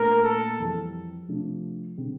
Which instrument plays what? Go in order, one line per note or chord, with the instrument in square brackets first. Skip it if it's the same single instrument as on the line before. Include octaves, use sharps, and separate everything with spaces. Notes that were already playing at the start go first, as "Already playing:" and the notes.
Already playing: [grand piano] A#2 A3 D4 [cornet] A#4
[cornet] A4
[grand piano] F2 E3 G3
C3 F3 A3 D4
D3 G3 C4